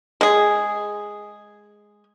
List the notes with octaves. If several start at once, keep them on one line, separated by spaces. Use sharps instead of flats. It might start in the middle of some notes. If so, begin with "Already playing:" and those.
G#3 G#4